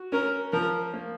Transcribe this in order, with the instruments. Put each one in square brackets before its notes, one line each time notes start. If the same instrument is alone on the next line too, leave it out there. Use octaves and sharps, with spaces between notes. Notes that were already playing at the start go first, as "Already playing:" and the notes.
Already playing: [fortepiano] F#4
[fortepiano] C#4 [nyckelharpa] A#4
[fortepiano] F3 [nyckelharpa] A#4
[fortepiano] A#3